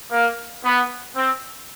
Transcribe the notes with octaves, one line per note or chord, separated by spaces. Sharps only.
A#3
B3
C4